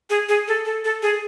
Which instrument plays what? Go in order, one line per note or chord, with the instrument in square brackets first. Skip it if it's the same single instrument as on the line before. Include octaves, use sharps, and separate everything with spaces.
[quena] G#4
G#4
A4
A4
A4
G#4